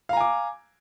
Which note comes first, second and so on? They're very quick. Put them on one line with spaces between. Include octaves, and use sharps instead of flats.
F5 A#5 G#5 D6